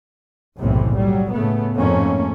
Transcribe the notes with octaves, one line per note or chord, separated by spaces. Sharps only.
F#1 B1 A2 C3 E3
F#3 G3
A2 C#3 A3 B3
F2 G#2 A3 A#3 C#4